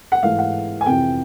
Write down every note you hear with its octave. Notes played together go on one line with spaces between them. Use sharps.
F#5
G#2 E3 A3 F5
F#5
G#5
F2 C3 E3 G5